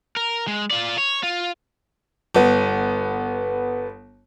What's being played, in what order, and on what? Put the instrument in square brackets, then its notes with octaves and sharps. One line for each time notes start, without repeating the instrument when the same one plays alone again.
[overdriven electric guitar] A#4
G#3
F4 D5
C#5
F4
[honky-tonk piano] G1 B3